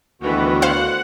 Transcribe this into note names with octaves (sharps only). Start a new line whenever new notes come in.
D2 D#3 E3 B3 F#4
C5 F5 F#5